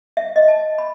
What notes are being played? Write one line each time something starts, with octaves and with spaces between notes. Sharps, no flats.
E5
D#5
A5
B5